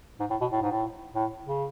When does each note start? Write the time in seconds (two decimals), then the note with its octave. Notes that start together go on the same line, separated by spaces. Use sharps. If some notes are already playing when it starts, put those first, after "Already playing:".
0.20 G#2
0.30 A2
0.41 B2
0.52 A2
0.62 G#2
0.71 A2
1.15 A2
1.47 C#3